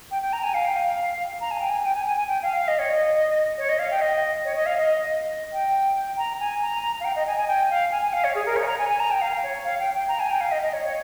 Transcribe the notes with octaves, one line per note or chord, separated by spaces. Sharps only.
G5
G5
A#5
G#5
F5
G5
F5
A#5
G#5
G5
G#5
G5
G#5
G#5
G#5
G5
F5
F5
D#5
C#5
D#5
C#5
D#5
F5
G5
D#5
C#5
D#5
F5
D#5
G5
A#5
G#5
A#5
F5
G5
D#5
G#5
G#5
G5
F5
G#5
G#5
F5
C#5
G#4
A#4
C#5
G#5
A#5
G#5
G#5
A#5
G5
F5
C#5
F5
G5
G5
A#5
G#5
G5
F5
D#5
D#5
C#5
C#5